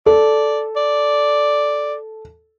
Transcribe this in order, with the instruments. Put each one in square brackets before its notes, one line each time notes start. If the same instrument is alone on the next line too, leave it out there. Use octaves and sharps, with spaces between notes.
[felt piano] A4 [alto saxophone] D5
[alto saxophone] D5